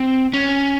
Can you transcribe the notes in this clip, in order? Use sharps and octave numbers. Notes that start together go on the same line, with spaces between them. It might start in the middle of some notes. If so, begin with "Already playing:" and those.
Already playing: C4
C#4